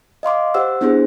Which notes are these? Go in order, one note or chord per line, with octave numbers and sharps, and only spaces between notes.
D#5 F5 C6 D6
G4 C5 F#5 E6
B3 D4 E4 G#4 C5